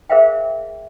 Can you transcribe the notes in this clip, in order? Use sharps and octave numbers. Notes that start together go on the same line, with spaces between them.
G#4 A#4 C5 E5 F5 G5